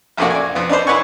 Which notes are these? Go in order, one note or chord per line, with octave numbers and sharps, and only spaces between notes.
A1 F2 A3 A#3 D4 F#4
D5 G#5
F2 B3
D4 D#4 B4 C5
E4 B4 C#5 F#5 G#5 C#6